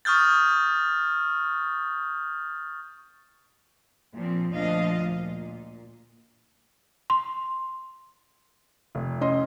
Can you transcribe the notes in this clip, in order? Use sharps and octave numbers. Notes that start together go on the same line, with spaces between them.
C#6 D#6 F6 G6 A6
A#2 F3 C4
D2 A#2 F3 D4 D#5 F5
A#2
C6
F1
C#4 D#5 C6